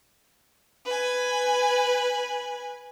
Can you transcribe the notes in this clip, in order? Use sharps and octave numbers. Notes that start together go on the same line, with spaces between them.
B4 G#5